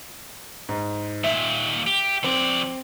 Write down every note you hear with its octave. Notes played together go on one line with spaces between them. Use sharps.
G#2
D#2 A#2 E5
G4
F3 C4 D5